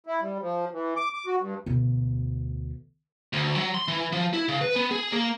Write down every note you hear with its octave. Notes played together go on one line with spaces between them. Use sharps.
E4
G3
F3
E3
D6
D6
F#4
G2
D2 B2
D2
F#3
C6
E3
F3
E4
C#3
B4
B3
G#4
A#3